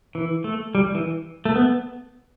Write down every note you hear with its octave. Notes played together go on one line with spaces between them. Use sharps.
E3
A3
G3
E3
A3
B3